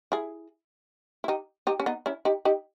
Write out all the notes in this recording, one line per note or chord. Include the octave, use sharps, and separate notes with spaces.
E4 G#4
E4
D#4 G4
D#4 G4
C#4
B3 D#4
C#4 E4
D#4 G4
D#4 G4